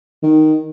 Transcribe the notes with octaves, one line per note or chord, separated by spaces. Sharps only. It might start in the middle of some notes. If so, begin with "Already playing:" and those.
D#3